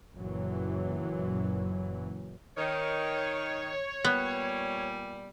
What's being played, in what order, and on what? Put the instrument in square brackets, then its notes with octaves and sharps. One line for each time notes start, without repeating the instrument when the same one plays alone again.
[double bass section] F#1 F#2 A#2 E3 F#3
[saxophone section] D#3 [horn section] C#5
[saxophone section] A#2 G3 [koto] B3